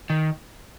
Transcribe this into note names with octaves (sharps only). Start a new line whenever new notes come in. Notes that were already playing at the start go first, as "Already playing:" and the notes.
D#3